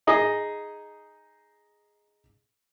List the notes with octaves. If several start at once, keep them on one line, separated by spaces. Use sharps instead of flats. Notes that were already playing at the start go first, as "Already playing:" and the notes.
D#4 G#4 D#5